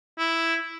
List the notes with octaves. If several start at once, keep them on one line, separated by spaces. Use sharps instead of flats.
E4